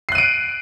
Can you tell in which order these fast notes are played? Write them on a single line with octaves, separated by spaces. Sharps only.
C7 F#6 D#7 D7